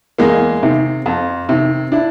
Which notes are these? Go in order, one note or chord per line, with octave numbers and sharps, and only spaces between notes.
E2 G#3 A#3
C3 D#3
F2
C3 D#3
D4 E4